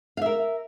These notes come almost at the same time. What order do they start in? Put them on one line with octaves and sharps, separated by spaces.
F5 E5 A#4